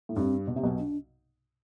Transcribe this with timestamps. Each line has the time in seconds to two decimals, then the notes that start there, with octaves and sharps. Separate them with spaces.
0.09 A2
0.16 G2 C4
0.47 B2
0.56 C3
0.63 B1 B2
0.79 D4